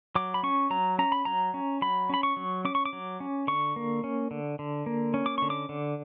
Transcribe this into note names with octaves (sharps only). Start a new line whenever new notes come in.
F#3 D6
B5
C#4 C#6
F#3 A#5
C#4 A#5
B5
F#3 A#5
C#4
F#3 B5
C#4 B5
C#6
F#3
C#4 D6
C#6
D6
F#3
C#4
D3 C#6
A#3
C#4
D3
D3
A#3
C#4
D6
D3 C#6
D6
D3